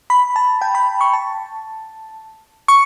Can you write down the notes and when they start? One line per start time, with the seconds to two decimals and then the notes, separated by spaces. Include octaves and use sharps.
0.10 B5
0.36 A5
0.61 G5
0.75 B5
1.01 C#6
1.13 A5
2.68 C#6